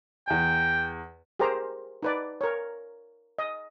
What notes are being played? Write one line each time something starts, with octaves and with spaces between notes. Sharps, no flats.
E2 G5 G#5
G4 G#4 A#4 C5 A#5
D#4 B4 D5
A#4 C#5
D#5